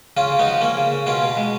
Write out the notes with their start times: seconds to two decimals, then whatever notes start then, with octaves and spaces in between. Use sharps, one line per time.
0.17 C#3 C#4 F4
0.32 C#3
0.39 B3 D#4
0.47 F3
0.61 A#3 C#4
0.77 C#3
0.92 C#3
1.06 B2 C#4 F4
1.22 B2
1.37 G#3